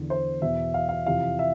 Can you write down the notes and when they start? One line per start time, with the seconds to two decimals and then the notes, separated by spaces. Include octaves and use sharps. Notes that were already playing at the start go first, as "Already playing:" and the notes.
Already playing: E2 D3
0.10 C5
0.42 E2 B2 E5
0.74 F5
0.89 F5
1.06 F2 C3 E3 F5
1.39 E5